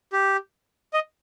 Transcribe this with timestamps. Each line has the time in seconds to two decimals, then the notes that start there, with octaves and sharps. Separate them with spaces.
0.13 G4
0.93 D#5